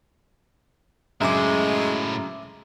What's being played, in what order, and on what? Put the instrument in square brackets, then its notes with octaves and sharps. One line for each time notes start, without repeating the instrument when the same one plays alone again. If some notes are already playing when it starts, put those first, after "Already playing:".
[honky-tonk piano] F#2 C#3 [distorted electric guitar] A2 C5 [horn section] G#3 [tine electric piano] E5 D6